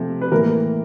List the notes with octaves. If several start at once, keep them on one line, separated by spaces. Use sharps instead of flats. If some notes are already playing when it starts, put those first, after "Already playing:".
Already playing: C3 F3 A3
B4
A2 E3 A#3 A#4